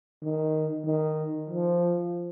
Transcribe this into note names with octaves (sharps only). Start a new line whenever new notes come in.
D#3
D#3
F3